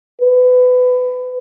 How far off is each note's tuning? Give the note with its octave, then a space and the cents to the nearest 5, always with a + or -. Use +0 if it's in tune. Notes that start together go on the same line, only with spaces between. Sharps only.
B4 +25